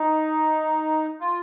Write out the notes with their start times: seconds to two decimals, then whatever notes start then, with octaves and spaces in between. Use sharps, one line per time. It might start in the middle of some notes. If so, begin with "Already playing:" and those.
Already playing: D#4
1.20 F4